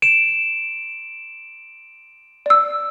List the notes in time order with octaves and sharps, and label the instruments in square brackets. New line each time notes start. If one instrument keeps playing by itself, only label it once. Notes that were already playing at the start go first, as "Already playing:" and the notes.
[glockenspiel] D7 E7
[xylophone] D5 E6